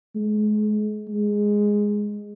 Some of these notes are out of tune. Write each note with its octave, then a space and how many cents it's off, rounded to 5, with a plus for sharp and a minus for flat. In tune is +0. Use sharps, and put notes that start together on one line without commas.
G#3 +35
G#3 -5